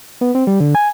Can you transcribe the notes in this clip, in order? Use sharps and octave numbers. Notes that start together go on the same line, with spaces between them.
B3
C4
G3
D3
G#5